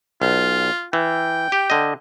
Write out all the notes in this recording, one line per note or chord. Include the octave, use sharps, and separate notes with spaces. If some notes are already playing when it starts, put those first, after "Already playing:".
B1 F4
E3 G5
G4
D3 D#5